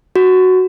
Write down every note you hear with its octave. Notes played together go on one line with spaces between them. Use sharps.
F#4